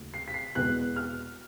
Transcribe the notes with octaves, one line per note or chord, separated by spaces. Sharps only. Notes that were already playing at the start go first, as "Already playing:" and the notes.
Already playing: D#2 C#3 F#3 A3
C7
B6
C7
E2 B2 G#3 B3 F#6
F6